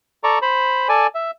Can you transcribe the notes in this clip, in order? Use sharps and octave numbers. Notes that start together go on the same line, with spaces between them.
A4 D5 A#5 C#6
C5 B5
A4 D5 G#5
E5